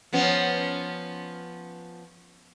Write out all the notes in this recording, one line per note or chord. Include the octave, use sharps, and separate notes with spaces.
F3 B3 C#4